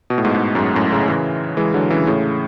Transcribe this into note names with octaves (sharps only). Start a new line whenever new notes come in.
B2
A2
G#2 B2
G#2
F#2
G#2
F#2 A2
A2 C#3
C#3 E3
E3 G#3
D3 F#3
C#3 E3
A2 C#3